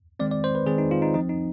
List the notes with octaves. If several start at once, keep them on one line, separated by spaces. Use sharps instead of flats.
D#3 G#3 C4 D5
D5
C5
B4
D#3 G#3 C4 G#4
D#4
F4
D#4
F3 C4 D#4
D#4